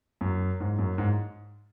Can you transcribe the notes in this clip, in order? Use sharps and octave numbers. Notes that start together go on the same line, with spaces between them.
F#2
G#2
F#2
G#2